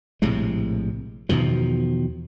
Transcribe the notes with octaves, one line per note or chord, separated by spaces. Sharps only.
A#1 A2 C3 G#3
E2 B2 D#3 F3